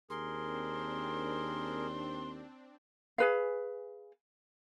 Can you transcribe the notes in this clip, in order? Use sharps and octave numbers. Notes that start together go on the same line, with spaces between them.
D#2 C4 D4 G#4 A#4 C6
G#4 B4 F5